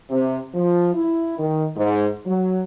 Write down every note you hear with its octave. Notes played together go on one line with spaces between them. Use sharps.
C3
F3
E4
D#3
G#2
F#3